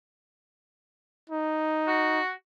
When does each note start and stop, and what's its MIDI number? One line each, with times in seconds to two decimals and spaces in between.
1.30 2.20 63
1.88 2.30 66